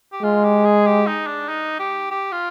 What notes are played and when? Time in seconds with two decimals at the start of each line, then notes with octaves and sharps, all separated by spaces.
0.12 G4
0.23 G#3 F4
0.44 G4
0.65 G#4
0.86 G4
1.07 D#4
1.27 D4
1.49 D#4
1.79 G4
2.11 G4
2.32 F4